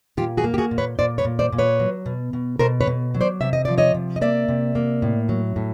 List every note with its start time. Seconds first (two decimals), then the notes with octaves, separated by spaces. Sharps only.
0.17 A#2 F4 G4
0.37 F#4 G#4
0.44 A#3
0.54 G4
0.58 F#4 G#4
0.71 A#2
0.78 B4 C#5
0.99 A#2 C5 D5
1.18 B4 C#5
1.25 A#2
1.39 C5 D5
1.52 A#2
1.58 B4 C#5
1.80 F#3
2.06 B2
2.33 B2
2.59 B2 A#4 C5
2.81 B4 C#5
2.87 B2
3.15 F#3
3.21 C5 D5
3.41 C3 E5
3.53 D#5
3.65 F3 D5
3.78 C#5 D#5
3.94 C3
4.16 D#5
4.21 A#3 D5 E5
4.48 C3
4.75 A#3
5.02 A2
5.29 F#3
5.56 A2